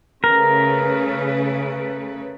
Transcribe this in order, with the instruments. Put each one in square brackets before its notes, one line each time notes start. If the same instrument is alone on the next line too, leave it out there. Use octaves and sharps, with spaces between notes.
[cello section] C#3 A3 B4 [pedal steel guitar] A#4